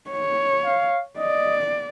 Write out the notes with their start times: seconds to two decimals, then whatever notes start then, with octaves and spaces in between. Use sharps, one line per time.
0.10 C#5
0.65 F5
1.18 D5 D#5